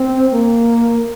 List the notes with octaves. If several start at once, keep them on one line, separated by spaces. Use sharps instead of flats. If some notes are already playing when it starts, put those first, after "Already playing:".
Already playing: C4
A#3